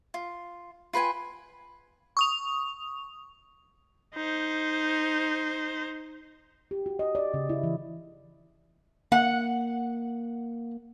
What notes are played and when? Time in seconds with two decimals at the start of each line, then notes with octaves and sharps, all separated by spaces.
0.14 F4
0.93 F4 B4 G5 G#5
2.17 C#6 D#6 F7
4.15 D#4 C5
6.71 G4
6.86 F#4
6.99 D#5
7.15 D5
7.34 C#3
7.49 E4
7.63 E3
9.12 A#3 F#5